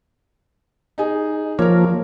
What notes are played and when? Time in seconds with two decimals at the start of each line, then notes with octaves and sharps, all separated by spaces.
0.98 D#4 G#4
1.59 F3 A#3 A#4 C#5